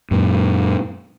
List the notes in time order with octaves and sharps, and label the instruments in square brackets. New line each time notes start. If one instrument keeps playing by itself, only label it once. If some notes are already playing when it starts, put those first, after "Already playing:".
[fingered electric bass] F#2 A#2